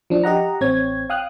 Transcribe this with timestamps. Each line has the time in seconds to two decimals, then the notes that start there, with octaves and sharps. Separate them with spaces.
0.10 F3 D4
0.24 G4 D#5 F#5 A#5
0.61 A1 C4 C#5 G#6
1.10 F5 G5 D#6 F6 F#6